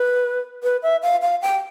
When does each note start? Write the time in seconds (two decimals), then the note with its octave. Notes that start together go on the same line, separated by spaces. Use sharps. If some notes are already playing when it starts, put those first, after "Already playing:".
Already playing: B4
0.63 B4
0.83 E5
1.02 F5
1.22 F5
1.42 G5